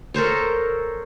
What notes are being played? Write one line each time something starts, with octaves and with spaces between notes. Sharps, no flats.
A4 A#4 C5 C#5